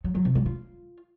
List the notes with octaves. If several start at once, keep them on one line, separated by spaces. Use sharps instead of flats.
F#3
F#3
C3
G3
F4